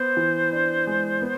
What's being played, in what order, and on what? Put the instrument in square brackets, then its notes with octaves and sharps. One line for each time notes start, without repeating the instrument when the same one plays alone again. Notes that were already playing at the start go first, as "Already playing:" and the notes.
Already playing: [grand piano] B3 [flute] C5
[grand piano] E3
D4
G#3
B3